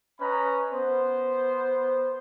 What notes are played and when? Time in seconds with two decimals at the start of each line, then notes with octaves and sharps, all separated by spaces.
0.19 C#4 B4 D#5 A#5 B5
0.72 B3 C5